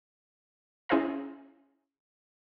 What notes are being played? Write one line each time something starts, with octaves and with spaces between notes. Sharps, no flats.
C#4 E4 G#4 C5 F5 A#5